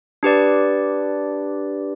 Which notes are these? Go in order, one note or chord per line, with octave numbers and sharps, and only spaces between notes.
D4 G4 B4 D5